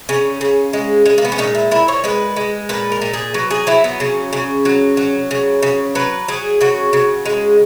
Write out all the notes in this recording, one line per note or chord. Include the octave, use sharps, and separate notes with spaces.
C#3 C#4
C#3
G#3
G#3
A#3
B3
C#4
A#2 D#4
E4
A#2 E4
C#5
G#3 B4
G#3
A#2 B4
A#4
A#2
G#4
F#3 B4
G#4
F#3 E4
B3
C#3 C#4
C#3
F#3
F#3
C#3
C#3
F#3 B4
F#3 G#4
C#3 F#4
C#3
G#3